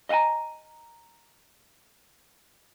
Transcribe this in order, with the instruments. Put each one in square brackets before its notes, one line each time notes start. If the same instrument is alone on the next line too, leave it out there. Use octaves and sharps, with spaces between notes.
[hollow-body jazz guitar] D#5 F5 F#5 G#5 A#5